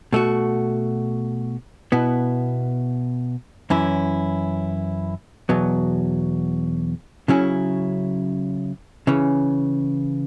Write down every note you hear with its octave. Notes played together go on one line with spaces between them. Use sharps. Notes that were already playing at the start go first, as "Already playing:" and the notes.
B2 A3 F#4
B2 B3 E4
F#2 E3 C#4 E4
E2 B2 F#3 B3
C#3 F#3 C#4 E4
C#3 E3 C#4